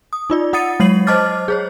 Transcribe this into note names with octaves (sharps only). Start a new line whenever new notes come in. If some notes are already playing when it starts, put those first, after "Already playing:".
D#6
D#4 F4 D5
F4 F#5 D#6 A6 C#7 D#7
F#3 G#3 C#5 C7 D#7 F#7
C5 D#5 A5 D6 F6 A6
G#4 C5 C#5